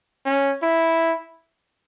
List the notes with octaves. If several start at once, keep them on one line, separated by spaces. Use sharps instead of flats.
C#4
E4